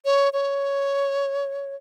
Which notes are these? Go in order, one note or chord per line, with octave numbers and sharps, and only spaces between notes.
C#5
C#5